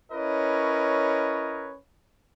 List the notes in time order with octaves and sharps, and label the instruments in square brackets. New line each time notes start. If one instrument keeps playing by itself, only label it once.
[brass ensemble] C#4 E4 A#4 B4 C#5 D#5